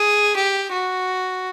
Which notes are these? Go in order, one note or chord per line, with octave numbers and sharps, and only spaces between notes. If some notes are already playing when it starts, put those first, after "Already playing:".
Already playing: G#4
G4
F#4